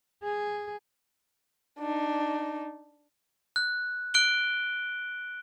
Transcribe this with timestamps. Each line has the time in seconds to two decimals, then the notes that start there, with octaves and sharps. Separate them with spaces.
0.23 G#4
1.79 D4 D#4
3.56 F#6
4.14 F#6 D7 G7